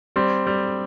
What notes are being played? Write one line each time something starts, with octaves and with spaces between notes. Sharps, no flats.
G3 C4
G3